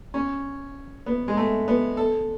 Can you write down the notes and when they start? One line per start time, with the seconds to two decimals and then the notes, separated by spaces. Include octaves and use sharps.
0.14 C#4
1.06 B3
1.28 G#3
1.37 A3
1.68 B3
1.97 A4